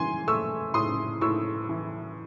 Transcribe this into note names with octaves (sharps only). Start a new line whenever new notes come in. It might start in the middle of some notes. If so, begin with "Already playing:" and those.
Already playing: E3 G#5 C6
A3 C#6 E6
A2 C6 D#6
A2 C#6 E6
E3